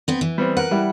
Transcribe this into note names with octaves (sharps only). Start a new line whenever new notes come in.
B3 C4
E3
G3 B3 C4
A#4 B4 F#5
G3 E4